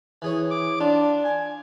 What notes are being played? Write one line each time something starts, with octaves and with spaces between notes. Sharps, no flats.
E3 G#4 C#5
D6
D4 F4
G#5